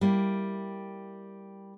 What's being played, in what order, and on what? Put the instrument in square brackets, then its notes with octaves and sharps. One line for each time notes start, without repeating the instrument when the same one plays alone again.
[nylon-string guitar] G3 A#3 E4